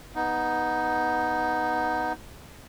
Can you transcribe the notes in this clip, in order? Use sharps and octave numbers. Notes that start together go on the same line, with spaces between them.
B3 D#4